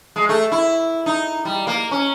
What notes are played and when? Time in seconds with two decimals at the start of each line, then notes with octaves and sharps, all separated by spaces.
0.16 G#3
0.29 A3
0.52 E4
1.06 D#4
1.45 G3
1.67 A#3
1.91 C#4